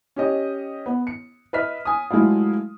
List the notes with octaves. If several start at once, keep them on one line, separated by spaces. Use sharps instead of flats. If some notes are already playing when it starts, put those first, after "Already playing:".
C#4 G4 D#5
B3
C#7
B4 D#5 E5 F6 B6
G#5 D#6
F#3 G#3 A3 E4 F4